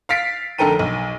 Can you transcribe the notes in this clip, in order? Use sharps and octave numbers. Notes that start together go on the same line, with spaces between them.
F5 A6 B6 C7 D7
F1 D3 A4 A#4 G5 D#7
B1